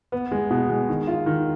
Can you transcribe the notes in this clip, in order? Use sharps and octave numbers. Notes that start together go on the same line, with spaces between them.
B3
G#3
B2
G#3
D#3
F4
D#3